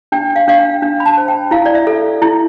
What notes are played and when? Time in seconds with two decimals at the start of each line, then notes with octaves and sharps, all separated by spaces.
0.12 D4 G5
0.36 F5
0.48 D4 F5
0.59 G5
0.82 D4
1.00 B5
1.06 A5
1.17 C5
1.28 G5
1.51 E4 F5
1.66 D5
1.75 E5
1.87 A4
2.22 E4